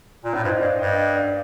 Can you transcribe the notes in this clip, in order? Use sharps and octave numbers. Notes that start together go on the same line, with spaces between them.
A#2
A2
G2 C5 D#5
G2 D5 F5
G2 D#5 G5
D5 F5
D5 F5